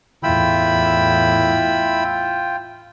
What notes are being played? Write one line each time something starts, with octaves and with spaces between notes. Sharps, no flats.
E2 A2 E4 F4 G5 B5 E6